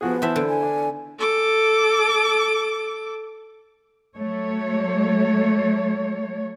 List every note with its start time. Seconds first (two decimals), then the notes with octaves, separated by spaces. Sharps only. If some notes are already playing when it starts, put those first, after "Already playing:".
0.01 F3 B3 F#4 G#4
0.22 E3 E4 C5 E5 A5
0.36 D3
0.47 G#5
0.63 D4
1.18 A4 D6
4.17 F#3 A3 C#5